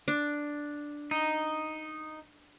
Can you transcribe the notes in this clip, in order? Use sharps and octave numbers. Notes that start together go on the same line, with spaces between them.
D4
D#4